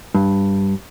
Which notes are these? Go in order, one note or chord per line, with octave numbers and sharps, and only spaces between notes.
G2